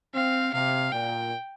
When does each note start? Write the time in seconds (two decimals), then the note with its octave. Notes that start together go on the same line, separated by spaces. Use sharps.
0.14 C4 F5
0.53 C3 F5
0.92 A#2 G5